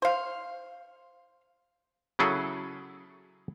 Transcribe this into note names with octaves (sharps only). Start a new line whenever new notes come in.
C5 F5
C#3 F#3 E4 G#4 A4